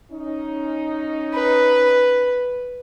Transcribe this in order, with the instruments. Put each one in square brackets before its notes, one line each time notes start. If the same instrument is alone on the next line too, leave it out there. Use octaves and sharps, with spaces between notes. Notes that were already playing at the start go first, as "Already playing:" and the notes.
[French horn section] C#4 D#4
[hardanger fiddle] B4